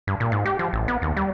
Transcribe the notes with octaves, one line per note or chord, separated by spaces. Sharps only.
G2
A#2
G#2
G4
F3
A1
B3
D#2
G3